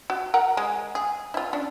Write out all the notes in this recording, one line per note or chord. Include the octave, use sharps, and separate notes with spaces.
F#4
A#4 F#5 A#5
G#3
G#4
E4 F4
C#4 D4